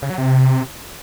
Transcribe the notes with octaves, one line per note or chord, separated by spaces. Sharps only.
C#3
F#3
C3